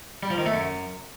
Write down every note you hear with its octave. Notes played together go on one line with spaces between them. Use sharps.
G3
F3
D#3
A3
F#2